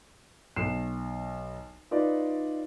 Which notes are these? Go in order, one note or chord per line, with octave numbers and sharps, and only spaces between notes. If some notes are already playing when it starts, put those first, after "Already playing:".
B1 C7 E7
D#4 F4 B4 D5